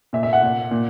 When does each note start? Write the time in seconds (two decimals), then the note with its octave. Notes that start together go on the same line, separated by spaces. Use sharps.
0.13 A#2 E5
0.23 E5
0.33 F#5
0.43 A#2
0.71 A#2